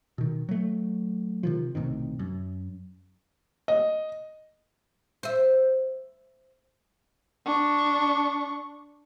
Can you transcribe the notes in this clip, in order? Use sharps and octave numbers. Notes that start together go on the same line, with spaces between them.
B2 D#3
F#3 A3
C3 D#3 F3
B1 A2 C3 D#3
F#2
D#5
C5 E5
D4 C#6